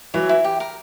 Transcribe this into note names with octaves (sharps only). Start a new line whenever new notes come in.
E3 F#3 C#5
E4
G4
A#4